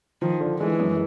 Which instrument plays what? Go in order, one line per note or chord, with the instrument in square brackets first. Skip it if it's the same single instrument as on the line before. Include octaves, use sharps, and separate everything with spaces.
[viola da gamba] D#3 [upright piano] F3
[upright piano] D3
[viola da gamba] E3 [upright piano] G#3
[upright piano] F#2